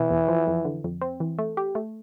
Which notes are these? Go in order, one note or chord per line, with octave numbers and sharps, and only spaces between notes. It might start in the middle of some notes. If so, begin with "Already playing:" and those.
Already playing: B2 E3
E2
F3
F2
D3
F2
C4
E3
A3
G4
A3